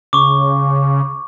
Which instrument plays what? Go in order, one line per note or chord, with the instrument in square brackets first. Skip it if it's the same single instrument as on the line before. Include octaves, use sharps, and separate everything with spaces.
[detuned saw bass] C#3 [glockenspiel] C#6 D6